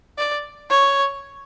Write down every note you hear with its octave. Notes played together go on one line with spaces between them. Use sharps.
D5
C#5